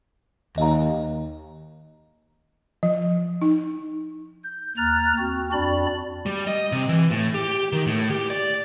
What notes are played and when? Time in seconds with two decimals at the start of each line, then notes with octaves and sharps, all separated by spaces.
0.58 D#2 D#5 A#5
2.83 F3
3.42 D#4
4.43 G6
4.77 D#2 A#5 F6 F#6 A6
5.18 C4 F#4
5.52 F2 C4 D4 F#4 D5 B5
6.26 G3
6.47 D#5
6.72 C3
6.89 E3
7.11 A2
7.34 G4
7.72 D#3
7.86 A2
8.10 G4
8.30 D5